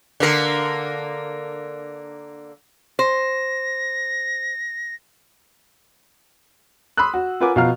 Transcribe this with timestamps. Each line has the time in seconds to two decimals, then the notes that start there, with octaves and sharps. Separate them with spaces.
0.20 D3 A#3 A#4
2.99 C5 A#6
6.97 B5 C6 D#6 E6 F#6
7.14 F#4
7.41 F4 A#4 B4 F#5 G#5 D6
7.56 B2 F3 F5 F#5 A#5 F6